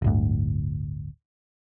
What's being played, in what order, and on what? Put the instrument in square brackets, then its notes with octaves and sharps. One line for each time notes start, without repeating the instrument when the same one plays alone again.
[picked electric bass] D1 G1 D2